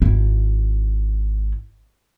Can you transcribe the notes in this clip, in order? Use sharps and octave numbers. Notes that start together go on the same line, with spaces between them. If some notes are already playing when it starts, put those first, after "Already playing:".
G#1 E4